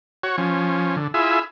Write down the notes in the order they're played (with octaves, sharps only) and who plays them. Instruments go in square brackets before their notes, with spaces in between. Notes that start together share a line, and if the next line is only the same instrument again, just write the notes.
[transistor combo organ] F#4 C#5
F3 C#4
D3
E4 F4 G#4 E5